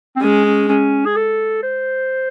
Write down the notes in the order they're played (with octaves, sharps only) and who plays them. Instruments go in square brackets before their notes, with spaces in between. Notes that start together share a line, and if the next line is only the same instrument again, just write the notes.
[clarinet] C4
[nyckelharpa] G#3 [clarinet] C#4
[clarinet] C#4
C#4
G#4
A4
C5